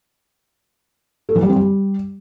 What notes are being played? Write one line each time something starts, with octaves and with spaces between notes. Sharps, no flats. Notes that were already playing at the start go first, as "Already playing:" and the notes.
A3
E3
G3
C4
G3